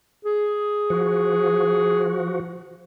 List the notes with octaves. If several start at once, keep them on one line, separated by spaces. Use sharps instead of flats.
G#4
F3 F#4